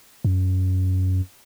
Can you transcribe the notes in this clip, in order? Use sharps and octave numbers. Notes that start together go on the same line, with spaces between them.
F#2